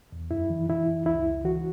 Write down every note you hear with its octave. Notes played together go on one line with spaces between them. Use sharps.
E2
F#2 E4
E3
E3 E4
F#2
C#2 E4
C#2
E3 F#4